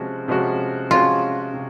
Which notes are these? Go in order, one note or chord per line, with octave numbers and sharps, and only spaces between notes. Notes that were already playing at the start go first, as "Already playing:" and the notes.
Already playing: C3 F3 G#3 C#4 F#4
C3 F3 G#3 C#4 F#4
C3 F3 G#3 C#4 F4 F#4
C3